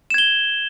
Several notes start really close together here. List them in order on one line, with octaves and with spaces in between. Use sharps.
E7 G#6 G7